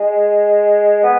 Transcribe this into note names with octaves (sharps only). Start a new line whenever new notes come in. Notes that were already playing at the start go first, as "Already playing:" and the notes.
Already playing: G#3
B3